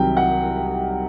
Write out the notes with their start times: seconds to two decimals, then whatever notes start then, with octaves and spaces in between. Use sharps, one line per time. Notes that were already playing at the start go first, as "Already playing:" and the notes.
Already playing: C2 C3 D#3 F#3 G5
0.17 F#5